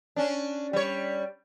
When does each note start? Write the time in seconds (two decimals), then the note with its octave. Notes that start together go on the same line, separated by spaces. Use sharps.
0.16 C#4 D4
0.73 G3 C#5